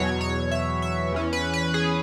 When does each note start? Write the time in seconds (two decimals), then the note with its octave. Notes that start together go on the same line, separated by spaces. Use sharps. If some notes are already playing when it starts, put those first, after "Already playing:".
Already playing: E2 B2 F#3 C#5
0.21 C#5
0.51 E5
0.82 E5
1.13 E2 E3 C#4
1.33 B4
1.54 B4
1.74 G#4